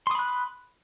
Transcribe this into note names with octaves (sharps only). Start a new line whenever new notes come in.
B5 C6 D#6 F#6